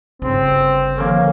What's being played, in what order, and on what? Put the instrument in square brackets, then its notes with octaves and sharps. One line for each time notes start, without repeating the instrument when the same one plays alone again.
[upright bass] G1 C#3 [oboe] C4
[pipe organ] D3 D#3 F3 [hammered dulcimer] A#3 C#4